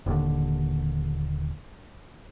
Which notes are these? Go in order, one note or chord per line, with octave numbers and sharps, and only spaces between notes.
D#1 D#2 D3